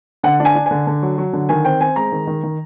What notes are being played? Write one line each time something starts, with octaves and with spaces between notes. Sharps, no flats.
D3 F#5
D4
G#5
D4
D3 G#5
D3
F#3
F#3
D3
D#3 G#5
C4 G5
C4 G#5
G#3 A#5
D#3
D#3
D#3